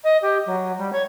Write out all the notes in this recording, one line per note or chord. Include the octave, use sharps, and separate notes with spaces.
D#5
G4
F#3
G3
C#5